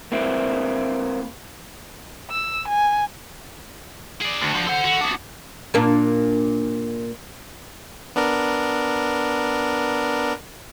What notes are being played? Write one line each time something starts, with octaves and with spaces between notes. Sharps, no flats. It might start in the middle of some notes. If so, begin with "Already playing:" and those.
A#3 C4 E4
E6
G#5
G#4 D5
D2 D4 F#4
F3
A4 C5 F#5
F#4
B3 D4
A#2 A#3 D4
B3 D4 A#4